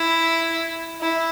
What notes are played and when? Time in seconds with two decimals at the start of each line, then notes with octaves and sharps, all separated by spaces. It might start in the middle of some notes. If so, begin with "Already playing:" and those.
Already playing: E4
1.01 E4